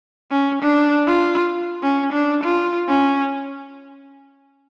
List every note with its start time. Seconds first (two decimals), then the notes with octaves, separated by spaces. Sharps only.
0.31 C#4
0.63 D4
1.07 F4
1.83 C#4
2.13 D4
2.44 F4
2.88 C#4